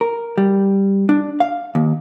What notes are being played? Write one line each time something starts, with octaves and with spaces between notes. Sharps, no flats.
A#4
G3
D4
F5
D#2